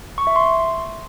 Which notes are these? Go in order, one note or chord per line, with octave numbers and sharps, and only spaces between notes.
C#6
E5
C6